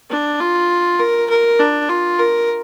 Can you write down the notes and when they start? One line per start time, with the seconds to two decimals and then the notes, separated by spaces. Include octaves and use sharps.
0.11 D4
0.40 F4
0.99 A#4
1.30 A#4
1.60 D4
1.89 F4
2.20 A#4